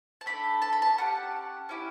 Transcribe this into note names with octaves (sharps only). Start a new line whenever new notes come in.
A5
A3 D4 A4 B5
A5
B5
A5
C#4 E4 G4 F#5
C#4 E4 G4